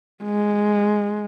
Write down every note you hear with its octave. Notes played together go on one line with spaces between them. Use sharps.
G#3